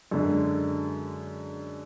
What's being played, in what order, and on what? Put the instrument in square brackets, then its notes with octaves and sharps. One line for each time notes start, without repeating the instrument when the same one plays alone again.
[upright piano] F#2 D3 G#3 D4